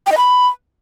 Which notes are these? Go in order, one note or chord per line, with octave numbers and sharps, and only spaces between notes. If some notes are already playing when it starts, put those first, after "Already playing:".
G5
D#5
B5